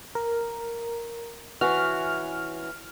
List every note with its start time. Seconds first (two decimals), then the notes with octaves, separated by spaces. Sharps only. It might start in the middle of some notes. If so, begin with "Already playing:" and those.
0.15 A#4
1.61 E3 C#4 F#4 F6